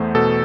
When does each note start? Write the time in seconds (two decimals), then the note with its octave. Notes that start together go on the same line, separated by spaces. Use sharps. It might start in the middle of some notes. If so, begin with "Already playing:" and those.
Already playing: E2 A3 B3 C5
0.15 B2 A4